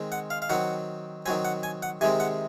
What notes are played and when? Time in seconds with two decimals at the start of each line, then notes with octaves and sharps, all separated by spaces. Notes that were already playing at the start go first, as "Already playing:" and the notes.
Already playing: D#3 G#3 C4
0.12 F#5
0.30 F5
0.42 F5
0.50 D#3 F#3 C4 F#5
1.26 D#3 F#3 C4 G#5
1.45 F#5
1.63 G#5
1.83 F#5
2.01 C3 D#3 G#3 C4 G#5
2.20 F#5